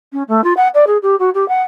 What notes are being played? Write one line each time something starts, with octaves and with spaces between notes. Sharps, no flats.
C#4
A3
F4
F#5
D5
G#4
G4
F#4
G4
F#5